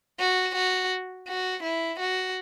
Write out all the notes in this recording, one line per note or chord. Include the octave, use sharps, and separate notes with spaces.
F#4
F#4
F#4
E4
F#4